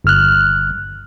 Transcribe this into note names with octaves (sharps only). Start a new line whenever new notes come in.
G1 F6 F#6